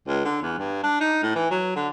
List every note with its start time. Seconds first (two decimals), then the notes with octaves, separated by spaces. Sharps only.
0.08 C#2
0.25 D3
0.42 E2
0.58 G2
0.83 D4
1.01 D#4
1.23 A2
1.35 E3
1.51 F#3
1.76 D3